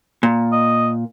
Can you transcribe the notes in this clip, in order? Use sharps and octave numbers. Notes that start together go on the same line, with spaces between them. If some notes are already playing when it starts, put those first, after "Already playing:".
A#2
D#5